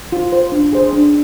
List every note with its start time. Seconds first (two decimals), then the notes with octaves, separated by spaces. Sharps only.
0.12 F4
0.32 C5
0.52 D4
0.73 G#4 C5
0.93 D4